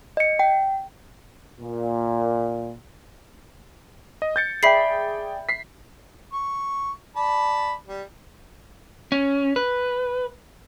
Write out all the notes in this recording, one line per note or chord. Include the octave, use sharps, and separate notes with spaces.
D#5 C#7
G5
A#2
D#5
G6 A6 C#7
G#4 D5 E5 G5 B5 C7
B6 C7
C#6
D5 A5 B5
G3
C#4
B4